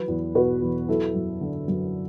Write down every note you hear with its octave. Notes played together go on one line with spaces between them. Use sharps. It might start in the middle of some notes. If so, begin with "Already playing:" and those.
Already playing: E3 F#3 B4
E2
B2 F#4 B4
E2
F#3 E4 A4
F#2
D3
F#2